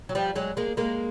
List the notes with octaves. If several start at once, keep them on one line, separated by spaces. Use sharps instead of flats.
F#3
F3 G3
F#3 G#3
G#3 A#3
G#3 A#3